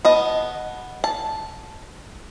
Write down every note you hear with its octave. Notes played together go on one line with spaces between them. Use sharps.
B3 D#5 A5
A5